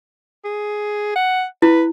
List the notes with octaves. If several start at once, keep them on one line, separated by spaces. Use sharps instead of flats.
G#4
F#5
E4 B4